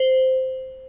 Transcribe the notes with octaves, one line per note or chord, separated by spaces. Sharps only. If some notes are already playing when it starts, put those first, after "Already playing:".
Already playing: C5